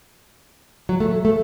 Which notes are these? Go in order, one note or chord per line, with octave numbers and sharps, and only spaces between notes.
F#3
A3
A3